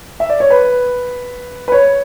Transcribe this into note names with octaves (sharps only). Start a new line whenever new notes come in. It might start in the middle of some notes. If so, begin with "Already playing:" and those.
E5
D5
C#5
B4
B4
C#5